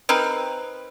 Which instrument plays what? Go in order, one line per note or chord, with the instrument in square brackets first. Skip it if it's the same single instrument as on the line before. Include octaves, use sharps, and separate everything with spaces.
[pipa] C4 D#4 A#4 B4